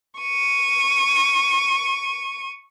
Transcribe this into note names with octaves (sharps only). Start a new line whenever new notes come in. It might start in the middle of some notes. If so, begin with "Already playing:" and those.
C#6 D#7